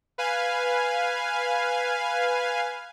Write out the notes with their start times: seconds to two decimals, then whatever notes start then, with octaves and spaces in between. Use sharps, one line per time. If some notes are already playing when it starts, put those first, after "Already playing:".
0.18 B4 F5 G#5